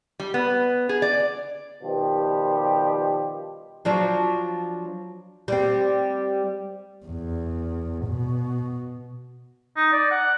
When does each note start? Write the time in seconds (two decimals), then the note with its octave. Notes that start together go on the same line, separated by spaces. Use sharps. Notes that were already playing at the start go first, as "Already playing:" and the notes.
0.20 G3
0.34 B3
0.89 G#4
1.02 D5
1.83 B2 D#3 F3 G3 G4
3.85 F3 F#3 D4
5.48 G3 C4
7.06 E2
8.07 B2
9.77 D#4
9.92 D5
10.11 F#5